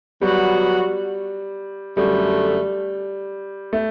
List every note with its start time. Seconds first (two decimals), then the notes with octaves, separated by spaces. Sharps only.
0.22 F#3 G3 B3 F#4
1.97 F#2 D3 G3 A3
3.73 A3